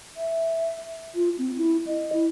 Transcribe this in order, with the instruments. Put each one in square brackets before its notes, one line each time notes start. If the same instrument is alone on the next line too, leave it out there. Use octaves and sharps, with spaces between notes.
[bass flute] E5
F4
C4
E4
D#5
E4